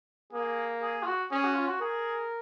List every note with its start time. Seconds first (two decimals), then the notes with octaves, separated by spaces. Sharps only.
0.33 A#3 G#4
0.82 G#4
1.03 F4
1.07 F#4
1.31 C#4 G#4
1.44 F#4
1.55 F4
1.68 F#4
1.80 G#4 A#4